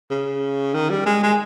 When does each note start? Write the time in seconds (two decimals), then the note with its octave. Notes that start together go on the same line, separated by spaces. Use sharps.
0.10 C#3
0.74 D#3
0.90 G3
1.06 G#3
1.23 G#3